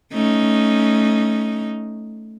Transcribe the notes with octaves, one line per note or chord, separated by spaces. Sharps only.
A3 C#4 D#4